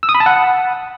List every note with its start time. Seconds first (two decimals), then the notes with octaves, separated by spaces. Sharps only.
0.03 E6
0.09 D#6
0.15 B5
0.20 A5
0.26 F#5